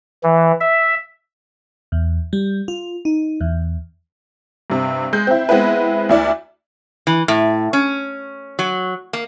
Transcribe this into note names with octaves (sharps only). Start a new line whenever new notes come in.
E3
E5
E2
G3
F4
D#4
E2
G2 C3
G#3 G6
C4 E4
G#3 B3 C4 E4 B4
D2 E4 D5
E3
A2
C#4
F#3
A#3